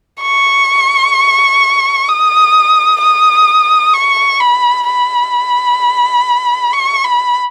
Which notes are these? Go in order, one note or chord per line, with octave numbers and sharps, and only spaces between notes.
C#6
D#6
D#6
C#6
B5
B5
C#6
B5